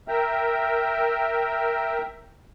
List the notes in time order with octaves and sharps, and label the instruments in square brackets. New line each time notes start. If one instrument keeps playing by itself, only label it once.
[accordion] A#4 E5 G5 A#5